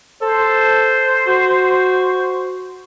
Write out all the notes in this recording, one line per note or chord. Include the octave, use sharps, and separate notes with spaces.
A4 C5
F#4